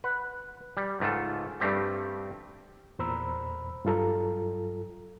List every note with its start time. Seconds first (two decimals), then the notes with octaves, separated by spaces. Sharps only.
0.04 B4 F#5
0.77 G3
1.00 C#2 G#2 A3 F4 A4
1.60 G2 G3 A3 C4 G4
2.99 E2 A#2 C5 A#5 B5 E6
3.85 G2 F#3 F4 A4 A#5